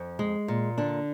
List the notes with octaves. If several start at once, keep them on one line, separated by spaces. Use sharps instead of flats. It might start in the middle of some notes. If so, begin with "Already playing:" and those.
Already playing: F2
G#3
A#2
D3 D4